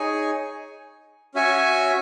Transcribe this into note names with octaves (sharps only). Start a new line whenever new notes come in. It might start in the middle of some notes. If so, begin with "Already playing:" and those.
Already playing: D#4 G#4 C#5 G#5
C#4 F#4 C#5 E5 G#5